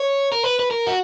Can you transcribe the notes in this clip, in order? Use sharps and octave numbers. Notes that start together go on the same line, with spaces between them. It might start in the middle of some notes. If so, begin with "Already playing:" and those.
Already playing: C#5
A#4
B4
B4
A#4
F#4